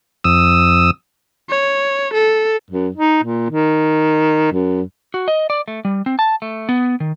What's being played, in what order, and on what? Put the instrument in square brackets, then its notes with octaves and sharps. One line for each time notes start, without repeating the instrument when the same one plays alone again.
[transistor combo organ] F2 D#6 E6
[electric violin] C#5
A4
[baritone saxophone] F#2
D#4
A#2
D#3
F#2
[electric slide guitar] F#4
D#5
D5
A3
G3
C4
A5
A3
B3
D#3